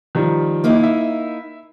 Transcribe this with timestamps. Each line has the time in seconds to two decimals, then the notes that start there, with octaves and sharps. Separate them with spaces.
0.15 D#3 F3 G3
0.64 A#3 D#4 E4
0.83 E5